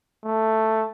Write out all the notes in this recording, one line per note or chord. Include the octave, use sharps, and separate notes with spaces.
A3